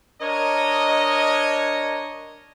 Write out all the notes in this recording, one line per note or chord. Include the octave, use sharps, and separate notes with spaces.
D4 A#4 C#5 D#5